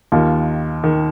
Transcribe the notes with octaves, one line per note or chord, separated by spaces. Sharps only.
D#2 D#3 F4
D#3